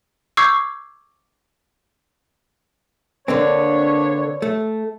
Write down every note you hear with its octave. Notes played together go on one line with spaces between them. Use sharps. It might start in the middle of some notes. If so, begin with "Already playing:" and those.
C#6 D6 E6 G6 G#6 C7
D3 A#3 C4 D4 B4 C#5
A3